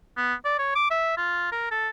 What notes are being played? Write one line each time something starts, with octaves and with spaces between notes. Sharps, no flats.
B3
D5
C#5
D6
E5
F4
A#4
A4